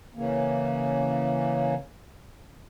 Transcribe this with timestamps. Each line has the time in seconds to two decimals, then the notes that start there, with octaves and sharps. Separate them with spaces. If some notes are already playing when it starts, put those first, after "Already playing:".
0.15 C#3 E3 A#3 C#4